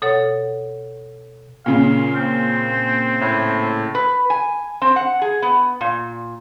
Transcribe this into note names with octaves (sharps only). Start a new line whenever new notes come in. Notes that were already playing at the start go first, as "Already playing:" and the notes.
B2 A4 C#5 F#5
A#2 C#3 F5
C4
A2
B4
G#5
C4
F#5
G#4
B3
A#2